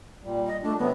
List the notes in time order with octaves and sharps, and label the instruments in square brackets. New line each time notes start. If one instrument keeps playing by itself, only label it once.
[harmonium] A#2 G3
[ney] D#5
[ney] A3 [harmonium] D4
[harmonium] C3 F#3 [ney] B3